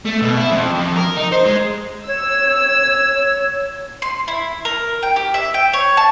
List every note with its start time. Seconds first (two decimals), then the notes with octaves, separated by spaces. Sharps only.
0.06 A3
0.22 B2
0.37 E4
0.50 F2
0.74 F2
0.96 A#4
1.16 D#4
1.32 C5
1.45 G#3
2.07 C#5 E6
4.02 C6
4.28 E4
4.65 A#4
5.03 G5
5.16 G4
5.34 E5
5.54 G5
5.73 C#5
5.97 A5